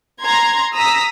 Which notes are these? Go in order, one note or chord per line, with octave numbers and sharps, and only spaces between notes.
A#5 C6 G#6
A#5 D#6 E6 A#6 B6